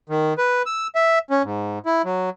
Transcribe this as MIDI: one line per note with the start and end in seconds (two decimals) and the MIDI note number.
0.09 0.34 51
0.38 0.62 71
0.66 0.87 88
0.95 1.19 76
1.30 1.43 61
1.44 1.79 44
1.86 2.02 64
2.05 2.30 54